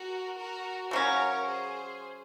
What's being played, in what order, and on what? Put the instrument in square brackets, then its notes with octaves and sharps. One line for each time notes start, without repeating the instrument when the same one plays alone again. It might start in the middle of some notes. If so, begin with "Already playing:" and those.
Already playing: [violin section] F#4 A#4
F#4 A#4
[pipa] C#3 F#3 C#4 [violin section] A#4 C#5
[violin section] G#4 C5